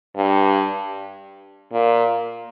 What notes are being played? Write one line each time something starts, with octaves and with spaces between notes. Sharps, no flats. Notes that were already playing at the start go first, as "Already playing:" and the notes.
G2
A#2